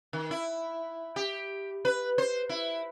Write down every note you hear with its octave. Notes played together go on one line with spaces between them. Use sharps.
D#3
E4
G4
B4
C5
E4